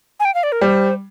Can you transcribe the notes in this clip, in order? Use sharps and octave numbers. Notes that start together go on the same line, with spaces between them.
G#5
G5
F5
D5
A#4
G3 C5